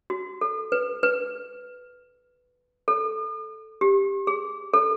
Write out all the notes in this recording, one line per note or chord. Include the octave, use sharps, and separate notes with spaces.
F#4
A4
B4
B4
A4
G4
G#4
A4